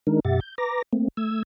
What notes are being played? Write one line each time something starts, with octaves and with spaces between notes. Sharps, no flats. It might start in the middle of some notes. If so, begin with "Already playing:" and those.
D#3 G#3 D4 D#4 A#4
F#2 B2 G4 E5 F#5 A6
G6
B4 A#5 D6 A#6
A3 A#3 C4
A3 E6 G#6